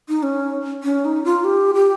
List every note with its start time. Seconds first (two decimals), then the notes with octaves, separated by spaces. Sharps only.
0.09 D#4
0.23 C#4
0.84 C#4
1.05 D#4
1.24 F4
1.44 G4
1.75 G4